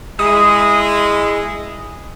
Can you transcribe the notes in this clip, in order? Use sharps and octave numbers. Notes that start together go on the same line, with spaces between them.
G#3 E4 D#6